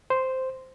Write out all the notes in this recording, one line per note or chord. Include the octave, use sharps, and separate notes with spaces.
C5